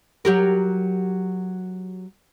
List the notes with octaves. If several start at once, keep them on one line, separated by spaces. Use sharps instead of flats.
F#3 G4 A#4